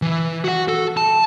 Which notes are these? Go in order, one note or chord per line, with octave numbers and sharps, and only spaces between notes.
E3
F#4 F#5
A4
A5